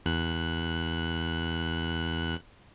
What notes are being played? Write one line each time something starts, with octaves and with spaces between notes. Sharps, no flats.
E2 F#6